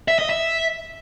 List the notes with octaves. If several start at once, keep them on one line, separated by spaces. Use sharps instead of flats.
E5
D#5
E5